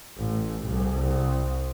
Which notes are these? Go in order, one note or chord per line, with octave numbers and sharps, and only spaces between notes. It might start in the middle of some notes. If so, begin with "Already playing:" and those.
A1
C2